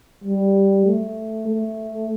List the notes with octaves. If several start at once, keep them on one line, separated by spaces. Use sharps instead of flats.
G3
A3
A3